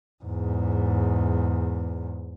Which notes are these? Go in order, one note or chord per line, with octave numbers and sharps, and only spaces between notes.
E2 G#2